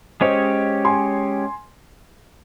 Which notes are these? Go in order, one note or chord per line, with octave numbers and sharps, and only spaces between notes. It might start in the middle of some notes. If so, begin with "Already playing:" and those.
G#3 C#4 G4 C5 C#5 D#5
G#5 C6